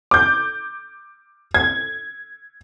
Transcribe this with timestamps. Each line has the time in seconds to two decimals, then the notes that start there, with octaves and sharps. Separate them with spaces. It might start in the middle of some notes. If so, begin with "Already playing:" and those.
0.11 D6 G6
1.54 G#6